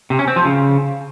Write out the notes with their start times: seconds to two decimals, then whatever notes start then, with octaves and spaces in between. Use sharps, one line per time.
0.10 C3
0.19 C#4
0.28 C4
0.36 F3
0.45 C#3